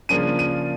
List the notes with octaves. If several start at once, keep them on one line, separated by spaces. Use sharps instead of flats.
C#3 F3 A#3 D4 D#7
D#7